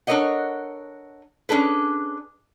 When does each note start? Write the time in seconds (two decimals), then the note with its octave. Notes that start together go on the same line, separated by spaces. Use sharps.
0.07 D4 A4 A#4 C#5 D#5 F#5
1.49 C#4 D4 G#4 A4 B4